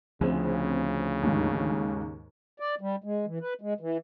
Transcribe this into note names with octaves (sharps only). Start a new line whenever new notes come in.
D2 C#3 F3 C4 G#4
D#2 G#2
D5
G3
G#3
E3
B4
G#3
E3